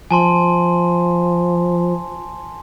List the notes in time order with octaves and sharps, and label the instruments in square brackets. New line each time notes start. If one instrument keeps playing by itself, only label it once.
[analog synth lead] F3 [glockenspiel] G#5 A5 C6